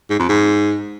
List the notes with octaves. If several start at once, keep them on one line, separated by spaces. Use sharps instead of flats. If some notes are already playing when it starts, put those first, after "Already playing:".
G#2
F2
G#2